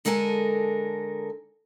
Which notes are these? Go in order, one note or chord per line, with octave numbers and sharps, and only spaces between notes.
D3 G#3 A4 A#4 F5 G#5